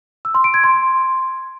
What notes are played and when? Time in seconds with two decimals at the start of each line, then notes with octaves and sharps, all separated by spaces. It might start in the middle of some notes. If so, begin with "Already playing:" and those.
0.25 E6
0.35 C6
0.44 D7
0.54 G#6
0.64 C6